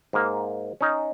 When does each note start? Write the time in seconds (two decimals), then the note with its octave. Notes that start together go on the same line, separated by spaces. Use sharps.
0.13 G#2 A#3
0.81 C#4 D#4